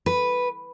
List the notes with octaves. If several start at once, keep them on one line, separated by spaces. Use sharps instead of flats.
B4